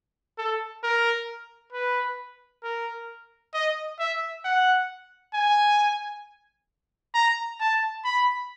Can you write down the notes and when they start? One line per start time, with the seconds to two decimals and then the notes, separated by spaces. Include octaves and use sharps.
0.38 A4
0.84 A#4
1.73 B4
2.64 A#4
3.54 D#5
4.00 E5
4.45 F#5
5.34 G#5
7.15 A#5
7.60 A5
8.05 B5